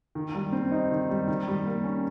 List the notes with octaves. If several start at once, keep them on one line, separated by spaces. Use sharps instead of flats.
D#3
G3
C4
D#4
D#3
G3
D#3
G3
A#3
C#4